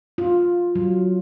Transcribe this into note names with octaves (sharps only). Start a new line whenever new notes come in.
F4
F#3